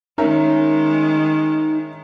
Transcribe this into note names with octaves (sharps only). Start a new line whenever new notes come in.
D#3 G#3 C#4 D#4 A#4 E5